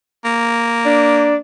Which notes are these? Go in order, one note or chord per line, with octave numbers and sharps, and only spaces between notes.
A#3
D4